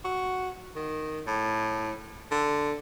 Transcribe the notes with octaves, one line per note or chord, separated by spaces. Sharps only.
F#4
D#3
A2
D3